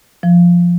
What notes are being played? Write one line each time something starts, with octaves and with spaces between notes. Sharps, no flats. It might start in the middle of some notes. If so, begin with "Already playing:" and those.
F3